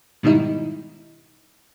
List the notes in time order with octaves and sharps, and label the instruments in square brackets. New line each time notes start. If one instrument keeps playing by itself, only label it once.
[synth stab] G#2 B2 D#3 G3 D#4 E4